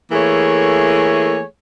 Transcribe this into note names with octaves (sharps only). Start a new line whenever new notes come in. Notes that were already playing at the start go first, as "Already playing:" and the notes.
E3 A3 A#3 G#4 C#5